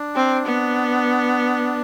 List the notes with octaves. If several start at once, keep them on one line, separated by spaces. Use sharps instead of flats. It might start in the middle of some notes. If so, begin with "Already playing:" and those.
Already playing: D4
C4
B3